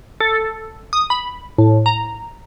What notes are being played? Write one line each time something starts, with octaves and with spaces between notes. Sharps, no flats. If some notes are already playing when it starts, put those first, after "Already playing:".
A4
D#6
B5
A2
A#5